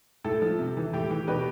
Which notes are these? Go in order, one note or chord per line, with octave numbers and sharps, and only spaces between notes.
A2 A4
F3
C3
E3
A2 G4
E3 G4
B2 G4 B4